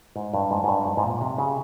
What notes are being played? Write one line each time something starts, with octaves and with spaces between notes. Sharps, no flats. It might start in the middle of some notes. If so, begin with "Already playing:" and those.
G#2
G2
G#2
G#2
G2
G#2
G#2
A#2
C3
C#3